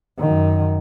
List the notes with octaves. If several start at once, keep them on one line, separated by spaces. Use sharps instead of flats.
F#2 D#3